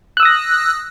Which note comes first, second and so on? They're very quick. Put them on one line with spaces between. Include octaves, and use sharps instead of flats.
F#6 E6 D#6 A#6